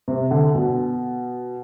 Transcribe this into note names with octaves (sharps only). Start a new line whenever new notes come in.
C3
D3
B2